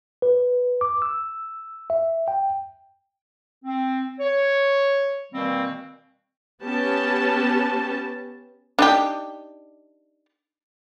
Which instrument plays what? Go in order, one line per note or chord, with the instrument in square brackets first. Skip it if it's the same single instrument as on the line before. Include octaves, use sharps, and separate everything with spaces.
[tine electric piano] B4
D6
E6
E5
G5
[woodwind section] C4
C#5
B2 D#3 E3 G3 A#3 C4
[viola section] B3 C#4 G4 A5
[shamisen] D4 D#4 G4